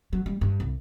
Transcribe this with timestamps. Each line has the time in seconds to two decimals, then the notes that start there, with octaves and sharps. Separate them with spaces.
0.13 F#3
0.26 G3
0.41 G2
0.60 C2